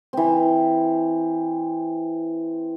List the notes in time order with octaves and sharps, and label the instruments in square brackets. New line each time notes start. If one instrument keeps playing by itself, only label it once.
[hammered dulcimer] E3 C4